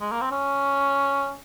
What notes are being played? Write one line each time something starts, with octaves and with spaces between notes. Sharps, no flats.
G#3
A#3
C4
C#4